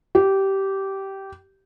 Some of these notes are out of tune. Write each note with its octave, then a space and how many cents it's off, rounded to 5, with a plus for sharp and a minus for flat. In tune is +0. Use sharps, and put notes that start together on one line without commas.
G4 -15